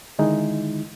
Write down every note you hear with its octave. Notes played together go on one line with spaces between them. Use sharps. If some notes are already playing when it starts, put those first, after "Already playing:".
D3 D#3 G#3 D#4 E4